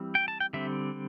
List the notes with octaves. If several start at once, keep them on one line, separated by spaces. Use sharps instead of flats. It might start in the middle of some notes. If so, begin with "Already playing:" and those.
Already playing: E3 G3 C4
G5
A5
G5
D3 G3 C4 E5